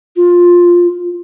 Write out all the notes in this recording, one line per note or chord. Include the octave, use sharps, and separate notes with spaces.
F4